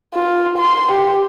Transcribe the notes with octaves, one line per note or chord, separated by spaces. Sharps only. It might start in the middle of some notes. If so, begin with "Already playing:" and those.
F4
C6
G4